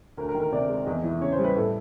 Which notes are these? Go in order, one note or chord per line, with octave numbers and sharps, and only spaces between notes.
D2 A#4
A#4
D#3
A#4
C3 D5
G#3
E2 D#5
E3
C#3 C#5
C5
G3
B4
A2 A4